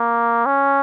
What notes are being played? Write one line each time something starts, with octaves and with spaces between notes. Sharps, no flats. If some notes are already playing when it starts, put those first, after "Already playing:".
Already playing: A#3
C#4